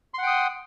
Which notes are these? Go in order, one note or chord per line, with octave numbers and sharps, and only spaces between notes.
F#5 G5 C6 D#6